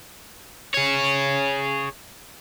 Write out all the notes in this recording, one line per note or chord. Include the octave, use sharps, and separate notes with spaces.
G#4 C#5